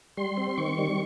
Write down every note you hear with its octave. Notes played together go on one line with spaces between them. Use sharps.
G3 C6
C4
D#3 C#6
G3